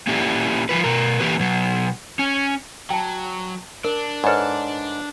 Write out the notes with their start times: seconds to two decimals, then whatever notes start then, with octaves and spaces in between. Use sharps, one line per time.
0.07 A#3 C#4 E4 G4 D5
0.69 F3 G#3 F4 B4
0.84 B2 A#4
1.20 D3 E3 A#3 G4 B4
1.40 B2 F#3
2.19 C#4
2.90 F#3 G5 A5
3.84 D4 A#4
4.24 G#2 A4 B4 C#5 D5